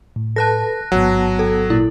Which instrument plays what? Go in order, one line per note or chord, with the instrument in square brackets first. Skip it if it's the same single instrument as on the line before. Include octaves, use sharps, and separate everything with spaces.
[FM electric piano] A2
[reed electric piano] A4 B4 [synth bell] A5 F#6 A#6
[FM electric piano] A1 G#2 [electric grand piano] F#3 [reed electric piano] B3 F#5
[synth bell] A4
[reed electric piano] A#2 [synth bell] E4